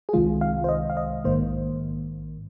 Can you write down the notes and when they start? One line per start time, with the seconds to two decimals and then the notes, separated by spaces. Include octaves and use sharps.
0.09 G#4
0.13 C2 C3 D#3 G#3 F4
0.41 F5
0.64 C5
0.69 D#5
0.90 F5
0.97 D#5
1.24 A#1 G#2 D#3 A#3 C5